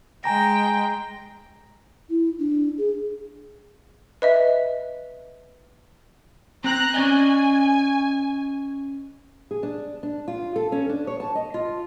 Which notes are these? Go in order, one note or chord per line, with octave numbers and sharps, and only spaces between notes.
G#3 G5 G#5 A#5 A#6
E4
D4
G#4
B4 D#5 E5
C4 A#5 F#6
C#4 D5 D#5 G#5
G#4
D4
D4
F4
A4
C#4
D4
C#5
A5
D#5
F4